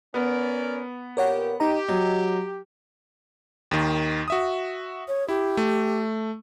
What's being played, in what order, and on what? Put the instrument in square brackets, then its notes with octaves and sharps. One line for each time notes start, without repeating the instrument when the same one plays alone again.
[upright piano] B3 [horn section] C#4 A#4 D5
[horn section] A#2 G4 [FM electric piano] A#4 C#5 F#5
[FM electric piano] D#4 D#5 A#5 [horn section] G4
[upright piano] F#3 [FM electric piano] D#5
[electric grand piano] D#2 D#3
F#4 E5 D#6
[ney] C#5
[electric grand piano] E4 [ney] G4
[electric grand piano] A3